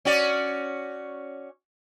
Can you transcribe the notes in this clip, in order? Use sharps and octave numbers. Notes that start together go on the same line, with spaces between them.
C#4 F#4 D5